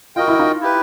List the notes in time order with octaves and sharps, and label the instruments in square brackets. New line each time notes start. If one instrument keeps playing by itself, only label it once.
[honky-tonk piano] F4 [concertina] F#4 A#4 D#5 G5
[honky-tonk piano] E4
D#4 F4
[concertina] E4 G4 B4